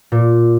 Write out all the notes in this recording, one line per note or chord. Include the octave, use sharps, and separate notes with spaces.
A#2